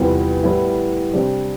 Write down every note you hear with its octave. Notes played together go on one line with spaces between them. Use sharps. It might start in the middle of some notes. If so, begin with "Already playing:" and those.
Already playing: E2 C3 G3 B3 F4
A2 G3 B3 E4
C3 G3 D4 G4